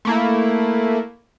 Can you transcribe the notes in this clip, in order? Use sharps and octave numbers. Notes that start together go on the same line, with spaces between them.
A3 A#3 E4